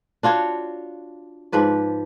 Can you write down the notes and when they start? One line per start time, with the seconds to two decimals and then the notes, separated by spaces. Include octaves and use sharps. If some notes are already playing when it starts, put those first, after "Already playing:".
0.23 D4 F4 F#4 C#5
1.52 G#2 F3 B4 D5